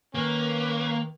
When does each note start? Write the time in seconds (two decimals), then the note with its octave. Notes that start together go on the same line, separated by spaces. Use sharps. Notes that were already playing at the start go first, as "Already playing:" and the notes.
0.15 D#3 A#3 C#4 B4